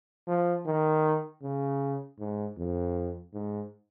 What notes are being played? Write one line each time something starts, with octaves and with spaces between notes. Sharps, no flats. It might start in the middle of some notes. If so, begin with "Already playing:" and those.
F3
D#3
C#3
G#2
F2
G#2